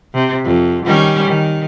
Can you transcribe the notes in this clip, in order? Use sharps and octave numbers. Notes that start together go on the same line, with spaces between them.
C3
F2
D#3 G3 C#4
D#3